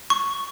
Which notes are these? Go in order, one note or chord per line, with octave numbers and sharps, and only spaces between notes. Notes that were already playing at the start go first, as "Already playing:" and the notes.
C#6